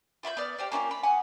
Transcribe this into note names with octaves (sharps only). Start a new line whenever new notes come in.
F4 E5 B5 G6
B3 D5 F6
G4 C5 D5
A#3 C#4 E4 F4
B5
F#5 G#5 D#6